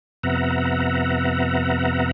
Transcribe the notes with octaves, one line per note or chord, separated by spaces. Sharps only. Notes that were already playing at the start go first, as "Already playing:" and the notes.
F2 C3 B3 E5 F#5 A#5